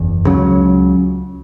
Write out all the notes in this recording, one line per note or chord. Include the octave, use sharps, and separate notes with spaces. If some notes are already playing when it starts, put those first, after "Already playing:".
Already playing: F#1 E2
C#2 C#3 F#3